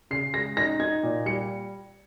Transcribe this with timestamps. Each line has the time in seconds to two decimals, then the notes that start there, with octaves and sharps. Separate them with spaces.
0.11 C#3 C7
0.33 G#3 A#6
0.57 D#4 A#6
0.79 D#4 G#6
1.03 A#2
1.26 G3 C#7